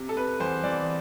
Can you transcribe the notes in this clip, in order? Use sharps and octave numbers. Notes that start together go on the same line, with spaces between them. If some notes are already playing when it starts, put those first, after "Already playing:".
Already playing: C3
A4
C3 B4
E2 C5
E2 D5